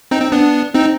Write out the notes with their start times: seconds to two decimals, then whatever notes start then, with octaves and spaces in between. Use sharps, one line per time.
0.11 C4 D#4
0.21 C4
0.32 B3 D4
0.74 C4 D#4